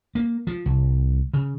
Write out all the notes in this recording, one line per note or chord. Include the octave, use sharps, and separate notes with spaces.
A#3
F3
C2
C#3